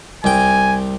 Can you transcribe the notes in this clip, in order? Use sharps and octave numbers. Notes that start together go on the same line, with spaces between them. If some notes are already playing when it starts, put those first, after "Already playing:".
C2 G5 G#5